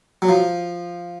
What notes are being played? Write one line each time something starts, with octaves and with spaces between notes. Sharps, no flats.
F#3
F3